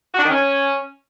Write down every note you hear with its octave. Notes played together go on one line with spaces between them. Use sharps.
F#4
D4
D#3
C#4